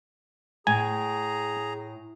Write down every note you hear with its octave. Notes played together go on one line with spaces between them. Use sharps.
A2 G#4 G#5 A#5